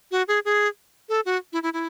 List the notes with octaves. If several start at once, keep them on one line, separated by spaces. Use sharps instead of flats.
F#4
G#4
G#4
A4
F#4
E4
E4
E4